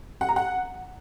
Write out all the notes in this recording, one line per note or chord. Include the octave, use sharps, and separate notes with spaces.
F#5
A#5
F#5